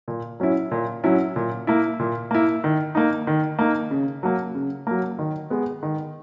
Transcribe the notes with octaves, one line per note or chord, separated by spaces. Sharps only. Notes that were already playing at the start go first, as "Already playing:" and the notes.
A#2
F#3 C#4 E4
A#2
F#3 C#4 E4
A#2
A#3 E4
A#2
A#3 E4
D#3
A#3 D#4
D#3
A#3 D#4
C#3
F#3 A#3
C#3
F#3 A#3
D#3
G#3 B3
D#3